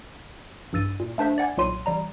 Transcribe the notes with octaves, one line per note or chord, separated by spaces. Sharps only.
A#1 G2 E6 A6 D#7
A#2
A3 D4 C5 E5
D5 F#5 G#5 G#6
B1 A#2 F#3 C6 D#7
A1 G3 A#5